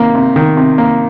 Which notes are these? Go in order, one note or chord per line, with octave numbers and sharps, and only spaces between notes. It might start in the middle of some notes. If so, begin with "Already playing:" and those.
Already playing: C3 D#3 A#3
C3
D#3
C3
A#3